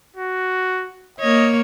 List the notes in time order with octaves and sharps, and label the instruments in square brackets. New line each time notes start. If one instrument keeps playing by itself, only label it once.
[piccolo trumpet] F#4
[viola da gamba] A#3 C#5 [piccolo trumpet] D#5